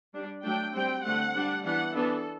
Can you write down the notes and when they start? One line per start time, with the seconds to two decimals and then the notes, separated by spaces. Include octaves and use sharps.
0.14 G3 D4
0.44 F#3 A3 D4 G5
0.74 G3 C4 G5
1.04 D3 A3 C4 F#5
1.35 G3 D4
1.65 E3 B3 D4 F#5
1.95 E3 B3 D4 A4